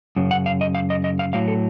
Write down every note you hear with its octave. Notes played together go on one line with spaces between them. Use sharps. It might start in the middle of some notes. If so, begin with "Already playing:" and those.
F#2 C#3
F#5
F5
D#5
F5
D#5
D#5
F5
A2 F#3 F5
A4